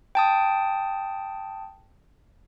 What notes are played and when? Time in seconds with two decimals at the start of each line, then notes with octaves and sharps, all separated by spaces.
0.15 G5 A5 D#6